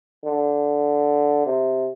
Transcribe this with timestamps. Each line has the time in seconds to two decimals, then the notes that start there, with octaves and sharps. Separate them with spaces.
0.24 D3
1.46 C3